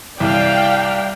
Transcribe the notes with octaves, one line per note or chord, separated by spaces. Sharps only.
C2 D5 F5 G5